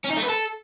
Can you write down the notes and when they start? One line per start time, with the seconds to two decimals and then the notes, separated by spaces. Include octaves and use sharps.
0.04 C#4
0.10 D#4
0.17 A3
0.23 B4
0.29 A4